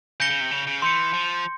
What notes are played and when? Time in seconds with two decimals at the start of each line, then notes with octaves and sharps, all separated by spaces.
0.20 C#3 G6 A#6 C#7 G7
0.30 C#3
0.41 C3
0.51 C#3
0.67 C#3
0.82 E3 C6 G6 C#7
1.13 F3